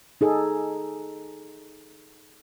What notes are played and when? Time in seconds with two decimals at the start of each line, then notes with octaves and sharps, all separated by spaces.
0.21 D#4 G#4 A4